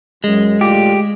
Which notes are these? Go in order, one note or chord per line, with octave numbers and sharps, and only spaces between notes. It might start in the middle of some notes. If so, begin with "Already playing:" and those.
F#2 G#3
A2 D3 F4 G4